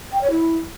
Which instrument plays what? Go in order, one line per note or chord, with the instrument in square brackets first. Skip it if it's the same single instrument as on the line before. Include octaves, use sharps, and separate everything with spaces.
[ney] G5
C#5
E4